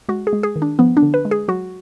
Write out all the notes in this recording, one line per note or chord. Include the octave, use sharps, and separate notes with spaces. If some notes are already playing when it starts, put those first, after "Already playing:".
G#3 F#4
G#4
G#3
G#4
D#3
D4
F3 B3
D4
D3
B4
G#3
G#4
F#3 F#4